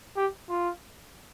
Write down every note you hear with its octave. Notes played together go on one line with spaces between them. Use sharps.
G4
F4